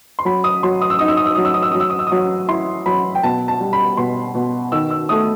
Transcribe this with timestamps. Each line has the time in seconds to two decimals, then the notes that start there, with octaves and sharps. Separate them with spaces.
0.19 C6
0.25 F#3 B5
0.44 D#6
0.63 F#3 C6
0.82 D#6
0.90 E6
0.99 D#4 D#6
1.08 E6
1.17 D#6
1.26 E6
1.35 F#3 D#6
1.45 E6
1.54 D#6
1.62 E6
1.71 F#3 D#6
1.80 E6
1.90 D#6
1.99 E6
2.07 F#3 D#6
2.48 E4 C6
2.86 F#3 B5
3.15 G5
3.23 B2 A5
3.48 A5
3.60 G3
3.73 B5
3.97 B2 C6
4.35 B2
4.72 D#3 E6
4.90 E6
5.09 A3 D#6